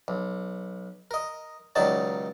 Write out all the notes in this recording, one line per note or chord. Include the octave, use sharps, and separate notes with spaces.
B1
A#4 D#5
C#2 D#3 F#3 D#4 D5 A5